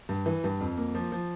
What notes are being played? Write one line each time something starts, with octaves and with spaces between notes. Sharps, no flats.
G2
E3
G2
F2
A#3
F3
F3